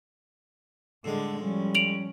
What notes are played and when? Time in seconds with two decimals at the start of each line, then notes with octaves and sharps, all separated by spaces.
1.04 A2 D3 G3 G#3
1.40 F3 G3 C#4
1.75 D7 F7 F#7